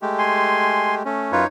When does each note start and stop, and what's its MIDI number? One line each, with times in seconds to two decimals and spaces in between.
0.02 1.03 56
0.02 1.03 57
0.02 1.03 67
0.19 0.95 80
0.19 0.95 84
1.05 1.32 57
1.05 1.32 61
1.32 1.45 42
1.32 1.47 63
1.32 1.45 65
1.32 1.45 71
1.32 1.47 73